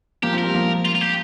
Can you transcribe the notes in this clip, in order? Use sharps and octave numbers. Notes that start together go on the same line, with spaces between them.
F3 A#3 G4
C4 F4
A#4
G3 C4
F3 A#3
F4
F4
G4